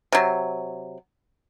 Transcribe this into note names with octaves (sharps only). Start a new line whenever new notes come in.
C3 F#3